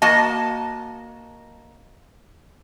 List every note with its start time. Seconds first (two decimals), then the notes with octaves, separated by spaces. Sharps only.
0.02 A#3 F#4 D#5 A5